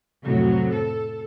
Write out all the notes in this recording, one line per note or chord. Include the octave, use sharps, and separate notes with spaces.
F2 A2 C3 F#3
A4